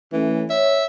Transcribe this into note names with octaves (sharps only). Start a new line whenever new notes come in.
E3 A3 C#4
C#5 E5